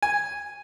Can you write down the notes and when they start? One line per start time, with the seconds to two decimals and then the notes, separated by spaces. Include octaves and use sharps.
0.02 G#5